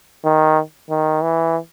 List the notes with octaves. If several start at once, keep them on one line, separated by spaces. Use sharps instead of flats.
D#3
D#3
E3